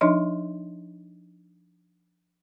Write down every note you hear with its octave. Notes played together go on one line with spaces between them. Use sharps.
F3 D4 D#4 C#5 D#5 C6